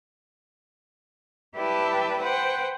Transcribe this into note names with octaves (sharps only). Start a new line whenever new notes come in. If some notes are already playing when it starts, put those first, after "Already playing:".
E4 G4 B4 D5 G5 A5
B4 C5 F#5 G5